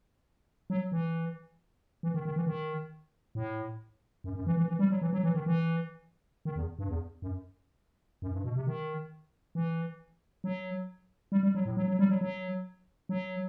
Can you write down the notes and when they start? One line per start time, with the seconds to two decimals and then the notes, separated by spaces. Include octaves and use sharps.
0.70 F#3
0.92 E3
2.03 E3
2.14 D#3
2.25 D#3
2.36 E3
2.47 D#3
3.35 A2
4.24 F#2
4.35 F#2
4.47 E3
4.57 E3
4.68 E3
4.79 G3
4.90 F#3
5.02 E3
5.13 F#3
5.23 E3
5.35 D#3
5.46 E3
6.45 D#3
6.56 E2
6.79 G2
6.89 E2
7.22 F#2
8.22 F#2
8.33 G2
8.44 B2
8.56 C3
8.67 D#3
9.55 E3
10.44 F#3
11.32 G3
11.43 G3
11.55 F#3
11.65 A2
11.77 F#3
11.88 F#3
11.99 G3
12.09 F#3
12.21 F#3
13.09 F#3